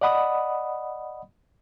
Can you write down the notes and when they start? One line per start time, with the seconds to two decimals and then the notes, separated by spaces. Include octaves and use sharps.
0.01 D5 D#5 F#5 B5 D#6